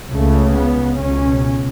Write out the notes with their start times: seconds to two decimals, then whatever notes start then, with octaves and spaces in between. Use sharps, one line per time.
0.11 C#2 C#3 A3
0.54 B3
0.97 C#2 B2 C#4